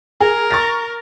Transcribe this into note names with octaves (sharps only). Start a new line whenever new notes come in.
G#4 A#4
C#6 A6 A#6